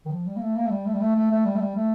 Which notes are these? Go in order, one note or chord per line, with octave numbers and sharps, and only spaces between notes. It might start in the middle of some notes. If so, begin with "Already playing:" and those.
D#3
F3
G3
A#3
A3
A#3
A3
G3
A3
G3
A3
A3
A3
G3
A3
G3
A3